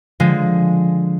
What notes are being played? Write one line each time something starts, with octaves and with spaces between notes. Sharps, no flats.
D3 F3 G#3